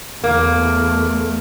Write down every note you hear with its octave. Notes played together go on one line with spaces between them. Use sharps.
E2 A3 A#3